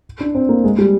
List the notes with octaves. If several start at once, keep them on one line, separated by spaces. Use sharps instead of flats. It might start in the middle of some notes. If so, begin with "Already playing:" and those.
D4
C4
A#3
G#3
G3